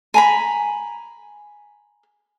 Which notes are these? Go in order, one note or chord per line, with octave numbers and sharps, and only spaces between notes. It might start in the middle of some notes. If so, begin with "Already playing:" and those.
G#5 A#5 B5